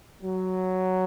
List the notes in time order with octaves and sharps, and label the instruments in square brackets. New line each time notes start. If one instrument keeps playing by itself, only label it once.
[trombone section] F#3